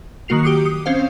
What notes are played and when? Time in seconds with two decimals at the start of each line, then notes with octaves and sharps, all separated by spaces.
0.28 D#3 F#3 A#3 F#4 C7 F7
0.43 G4 D6 D#6 C7 C#7
0.65 D#6
0.86 C4 C#4 C5 F5